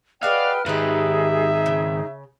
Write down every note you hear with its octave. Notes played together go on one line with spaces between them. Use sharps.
F#4 G#4 B4 D5 D#5 F5 G5 F6
G#2 D#3 D#4 G4 G#4 B4 E5
C#3